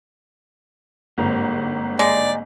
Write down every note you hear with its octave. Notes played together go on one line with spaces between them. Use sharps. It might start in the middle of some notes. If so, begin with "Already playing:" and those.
G1 G#2 A#3 C4
G#3 D5